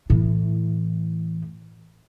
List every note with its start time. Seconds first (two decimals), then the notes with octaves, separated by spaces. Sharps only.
0.10 A2 E3